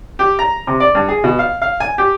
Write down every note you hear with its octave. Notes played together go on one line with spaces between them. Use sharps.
G4
A#5
C3
D5
G2
G#4
B2
F5
F5
G#5
G4